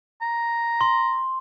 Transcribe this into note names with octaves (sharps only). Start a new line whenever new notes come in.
A#5
C6